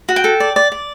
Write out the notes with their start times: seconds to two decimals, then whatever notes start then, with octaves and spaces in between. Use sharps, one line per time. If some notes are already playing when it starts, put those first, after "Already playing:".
0.09 F#4
0.16 G5
0.24 A4
0.40 D5
0.56 D5
0.72 D5